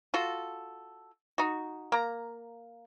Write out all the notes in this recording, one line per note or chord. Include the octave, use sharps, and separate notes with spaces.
F4 F#4 A4
D#4 F#4
A#3 A#5